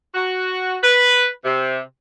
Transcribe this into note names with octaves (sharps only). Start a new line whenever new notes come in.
F#4
B4
C3